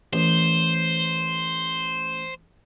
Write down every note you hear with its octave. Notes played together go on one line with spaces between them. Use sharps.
A1 C5